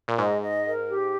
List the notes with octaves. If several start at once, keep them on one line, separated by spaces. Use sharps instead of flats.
A#2
G#2 D#5
D#5
A#4
G4